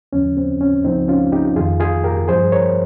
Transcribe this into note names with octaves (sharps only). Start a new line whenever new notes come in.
D#2 C#3 F3 C#4
C4
C#4
C#2 C#3 F3 C4 D#4
C#4 F4
D#4 G4
F2 D#3 F4 G#4
F4 G#4
G4 A#4
G2 F3 G#4 C5
A#4 C#5